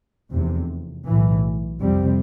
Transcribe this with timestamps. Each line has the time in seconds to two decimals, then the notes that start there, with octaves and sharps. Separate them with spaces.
0.31 F1 E2 C3
1.06 B1 A2 E3
1.81 F2 C3 G3 C4